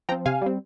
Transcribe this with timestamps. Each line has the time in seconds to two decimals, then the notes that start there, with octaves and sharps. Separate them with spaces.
0.09 F3 C4 G5 A#5
0.26 C3 F5 G#5
0.42 G3 C4